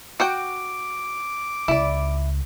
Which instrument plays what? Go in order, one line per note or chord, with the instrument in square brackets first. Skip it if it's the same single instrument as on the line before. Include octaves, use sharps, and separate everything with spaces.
[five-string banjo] F#4 F#5 G5 [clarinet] D6
[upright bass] C#2 [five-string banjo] E4 D5